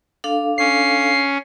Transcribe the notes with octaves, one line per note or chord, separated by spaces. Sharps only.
D4 A4 F5
C#4 C7